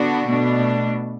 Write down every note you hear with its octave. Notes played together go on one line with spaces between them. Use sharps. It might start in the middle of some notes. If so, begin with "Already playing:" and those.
Already playing: D3 B3 D4 F#4
B2 A3 D4